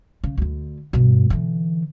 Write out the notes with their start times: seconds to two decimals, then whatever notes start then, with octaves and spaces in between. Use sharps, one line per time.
0.24 C#3
0.38 D2 D3
0.93 G2 B2
1.30 D3 E3